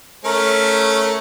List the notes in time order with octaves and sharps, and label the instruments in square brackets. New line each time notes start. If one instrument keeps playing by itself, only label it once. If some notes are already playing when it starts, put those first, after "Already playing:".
[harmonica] A3 C#4 [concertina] A#4